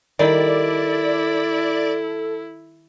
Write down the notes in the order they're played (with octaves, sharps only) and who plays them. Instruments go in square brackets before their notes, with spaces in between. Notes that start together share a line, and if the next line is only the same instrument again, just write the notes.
[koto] D#3 G3 [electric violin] E4 [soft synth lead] A4 [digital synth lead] D5